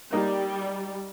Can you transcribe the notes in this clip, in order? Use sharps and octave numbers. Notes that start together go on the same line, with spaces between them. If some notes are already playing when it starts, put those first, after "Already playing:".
G3 A#3 D#4